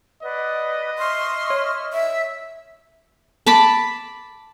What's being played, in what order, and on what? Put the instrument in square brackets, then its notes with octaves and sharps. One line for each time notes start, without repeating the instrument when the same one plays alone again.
[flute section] B4 D5 F#5 [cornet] D#5
[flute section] E5 C#6 F6 [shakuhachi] C6
[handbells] C#5
[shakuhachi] E5
[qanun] A5 B5 D6